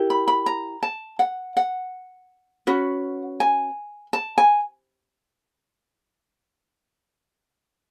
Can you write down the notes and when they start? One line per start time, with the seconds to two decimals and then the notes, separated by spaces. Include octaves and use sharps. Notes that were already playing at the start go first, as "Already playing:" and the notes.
Already playing: E4 G4 A#4
0.10 B5
0.28 B5
0.46 A#5
0.83 A5
1.19 F#5
1.57 F#5
2.67 C#4 F#4 B4
3.40 G#5
4.13 A5
4.38 G#5